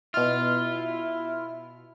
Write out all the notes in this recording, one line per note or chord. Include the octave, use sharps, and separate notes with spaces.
B2 E4 F4 F6